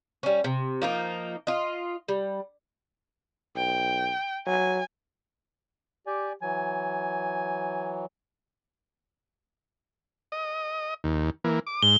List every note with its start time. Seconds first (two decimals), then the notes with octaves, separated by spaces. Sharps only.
0.23 G3 C#4
0.44 C3
0.82 F3 A#3 D#4
1.47 F4 D#5
2.08 G3
3.56 B1 G5
4.47 F#3 G#5
6.07 G4 D5 G#5
6.42 E3 F#3 G#5
10.32 D#5
11.04 D#2
11.44 E3 A#3
11.67 D6
11.82 G#2 G7